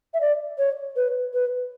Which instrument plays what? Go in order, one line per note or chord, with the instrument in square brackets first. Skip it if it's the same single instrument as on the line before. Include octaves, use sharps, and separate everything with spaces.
[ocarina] E5
D5
C#5
B4
B4